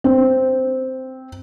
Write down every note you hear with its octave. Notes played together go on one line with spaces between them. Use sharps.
C4